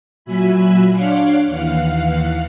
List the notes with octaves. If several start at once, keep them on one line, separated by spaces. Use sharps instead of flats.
A#2 F#3 F#4 E5 G#5 B5
D4 C#5 F5 F#5 C6 D6
D#2 E3 F5 F#5